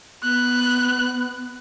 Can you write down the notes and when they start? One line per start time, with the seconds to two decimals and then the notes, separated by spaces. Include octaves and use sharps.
0.23 B3 F#6